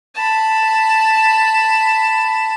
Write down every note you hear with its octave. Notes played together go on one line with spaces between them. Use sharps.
A5 B5